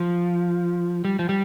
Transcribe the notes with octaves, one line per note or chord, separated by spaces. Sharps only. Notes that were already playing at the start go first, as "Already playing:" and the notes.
Already playing: F3
G3
F3
G3